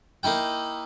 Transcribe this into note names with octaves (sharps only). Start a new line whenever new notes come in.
A#3 D#4 E4 G5